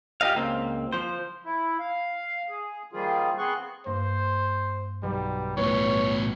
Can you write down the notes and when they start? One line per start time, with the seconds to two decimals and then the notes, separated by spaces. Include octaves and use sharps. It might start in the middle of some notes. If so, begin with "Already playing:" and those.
0.21 F4 G4 A4 D#5 F5
0.35 C#2 A#3 C4
0.93 F3 C5
1.45 E4
1.80 F5
2.49 G#4
2.93 D#3 F3 G3 A#3 F4 G#4
3.38 B3 C4 G#4 C6 C#6 F#6
3.86 G2 A#3 C5
5.03 B1 G3
5.57 A2 B3 B4 C#5 D5 B6